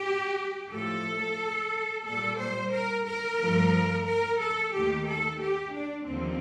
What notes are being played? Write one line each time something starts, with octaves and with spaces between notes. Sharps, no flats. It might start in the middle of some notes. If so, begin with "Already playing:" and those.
Already playing: G4
A2 F3 A3 A4
A#2 G3 A4
C5
A#4
A#4
G2 F3 A3
A#4
A4
D#2 D#3 A3 G4
A4
G4
D4
D#2 D3 F3 C4